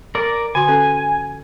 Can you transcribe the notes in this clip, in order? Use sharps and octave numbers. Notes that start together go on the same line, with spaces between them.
A#4 D5
D3 F#4 G#5 C6
C#4 A4